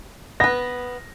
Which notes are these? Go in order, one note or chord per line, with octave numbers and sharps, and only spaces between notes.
B3 B4 A#6